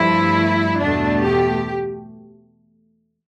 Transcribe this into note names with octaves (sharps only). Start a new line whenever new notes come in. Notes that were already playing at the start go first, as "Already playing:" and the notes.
Already playing: G2 F3 A3 E4
E2 B2 A3 D4
G4